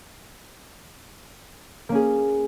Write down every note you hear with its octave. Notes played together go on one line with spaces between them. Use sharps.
A#3 C#4 G#4